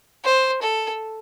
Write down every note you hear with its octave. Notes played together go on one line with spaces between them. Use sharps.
C5
A4